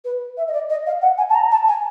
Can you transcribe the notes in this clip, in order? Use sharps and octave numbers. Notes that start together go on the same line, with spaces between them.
B4
E5
D#5
D5
D#5
F5
F#5
G#5
A5
A#5
A5
G#5